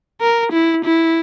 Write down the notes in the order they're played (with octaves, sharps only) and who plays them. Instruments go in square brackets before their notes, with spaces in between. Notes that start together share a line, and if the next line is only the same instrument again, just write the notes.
[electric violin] A#4
E4
E4